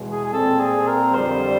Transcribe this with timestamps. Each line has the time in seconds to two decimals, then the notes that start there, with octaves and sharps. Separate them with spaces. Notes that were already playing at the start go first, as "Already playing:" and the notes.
Already playing: E2 B2 G#3
0.12 G#4
0.25 G#4
0.33 A#2 G3 C4 A4
0.60 G#4
0.87 A#4
1.14 F2 D3 G3 C5